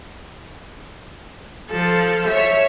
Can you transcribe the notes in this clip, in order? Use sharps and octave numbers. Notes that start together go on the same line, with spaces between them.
F3 A4
C#5 E5